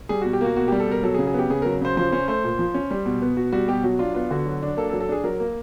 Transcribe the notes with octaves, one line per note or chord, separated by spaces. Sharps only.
G3 G#4
B2 F#4
G4
A#3 F#4
B2 F#4
G3 G4
A4
B2 A#4
F#3 A4
G#4
C#3
G#4
B3 G4
C#3 G#4
F#3 A#4
C#3 C5
F3 C5
C#4 C5
A3 C5
A#2
F3
C#4
G3
B2
B3
B2 F#4
G3 F#4
B2 G4
F#3 F#4
D4 F4
B3 F4
D3 F#4
F#3
D4
A#3 A4
A4
F#3
A4
D4 G#4
F#3 A#4
A#3